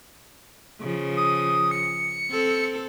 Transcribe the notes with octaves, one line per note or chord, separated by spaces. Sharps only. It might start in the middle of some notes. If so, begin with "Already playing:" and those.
C#3 F3
D#6
C#7
C4 A4